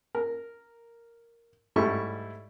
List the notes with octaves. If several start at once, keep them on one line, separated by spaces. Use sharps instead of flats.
A#4
G#2 G3 A3 E4 A5 C#6